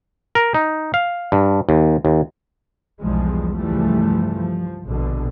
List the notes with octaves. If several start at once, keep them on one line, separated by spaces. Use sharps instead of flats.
A#4
D#4
F5
G2
D#2
D#2
B1 E2 F3 G3 G#3
C#2 G2 E3 F3 G3 A3
F3
A#1 B2 D3